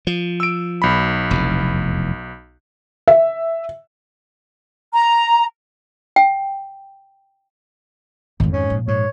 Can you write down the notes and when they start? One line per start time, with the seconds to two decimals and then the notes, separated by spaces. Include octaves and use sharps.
0.07 F3
0.40 E6 D7
0.82 B1 B5
1.31 F1 E2
3.08 E5
4.94 A#5
6.16 G5
8.40 G#1 F2 D#3
8.53 G#2 C#4
8.70 A#2 F3
8.88 G#2 C#5